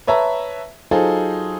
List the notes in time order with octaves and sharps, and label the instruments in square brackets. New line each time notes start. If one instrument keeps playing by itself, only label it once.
[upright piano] B4 C#5 E5 A5 A#5
F#3 D#4 F4 G#4 A4 C5